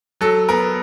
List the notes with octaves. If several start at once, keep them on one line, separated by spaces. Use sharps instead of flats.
F#3 A4
B3 A#4